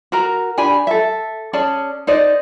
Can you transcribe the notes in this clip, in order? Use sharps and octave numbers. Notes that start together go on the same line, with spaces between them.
F#4 A#4 A#5
D4 G4 G#5 B5
A4 E5
C#4 G#4 D5 A5
D#4 C5 D5 D#5